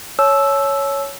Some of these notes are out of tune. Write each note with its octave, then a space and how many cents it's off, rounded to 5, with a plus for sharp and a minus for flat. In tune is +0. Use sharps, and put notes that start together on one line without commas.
C#5 +0 A5 -35 E6 +0